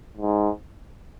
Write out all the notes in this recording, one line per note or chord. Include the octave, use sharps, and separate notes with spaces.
G#2